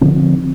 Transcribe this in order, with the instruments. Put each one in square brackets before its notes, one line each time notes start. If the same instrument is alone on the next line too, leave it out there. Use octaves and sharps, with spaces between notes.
[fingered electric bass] D3 F3 C4